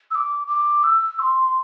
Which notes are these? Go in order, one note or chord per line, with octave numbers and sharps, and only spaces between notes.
E6
D6
D6
E6
C6